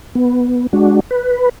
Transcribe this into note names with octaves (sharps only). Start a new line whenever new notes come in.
B3
G#3 D4 F#4
B4